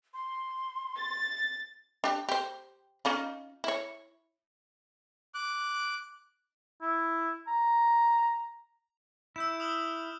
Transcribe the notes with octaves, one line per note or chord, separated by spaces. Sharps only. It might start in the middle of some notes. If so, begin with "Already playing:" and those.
C6
A6
D4 G4
G4 C5
C#4 D#4 F4
E4 C#5
D6 F#6
E4
A#5
E4 E6 G6 E7
D#6 F6 F#7